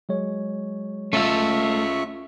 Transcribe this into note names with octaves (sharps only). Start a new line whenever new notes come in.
F#3 G#3 C#5
A3 C#4 F4 E5 A5 C#6 E6